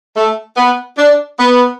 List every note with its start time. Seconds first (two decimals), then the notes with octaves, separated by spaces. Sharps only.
0.16 A3
0.57 B3
0.98 D4
1.38 B3